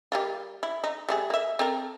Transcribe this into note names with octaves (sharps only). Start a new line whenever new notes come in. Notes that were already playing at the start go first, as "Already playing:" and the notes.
G3 A#3 F4
E4
D#4
G3 A3 G#4
A#3 E5
C4 A4 A#4